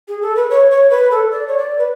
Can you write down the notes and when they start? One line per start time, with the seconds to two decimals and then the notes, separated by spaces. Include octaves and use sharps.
0.08 G#4
0.22 A4
0.36 B4
0.50 C#5
0.71 C#5
0.90 B4
1.11 A4
1.31 D5
1.48 C#5
1.58 D5
1.78 B4